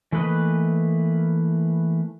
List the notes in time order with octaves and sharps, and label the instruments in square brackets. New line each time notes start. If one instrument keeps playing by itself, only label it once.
[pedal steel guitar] E3 A3 A#3 B4 D#5